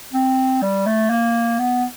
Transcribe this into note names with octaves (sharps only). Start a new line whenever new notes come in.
C4
G3
A3
A#3
B3